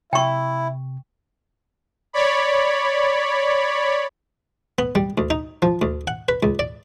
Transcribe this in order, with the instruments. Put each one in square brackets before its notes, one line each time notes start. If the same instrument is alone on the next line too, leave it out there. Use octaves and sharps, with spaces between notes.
[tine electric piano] C3 [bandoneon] E4 [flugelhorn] E5 [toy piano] G5 C#6
[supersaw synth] C#5 D5 B5
[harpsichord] B3
G3
D2
D#4
F3
D2
F#5
B4
C#2
D5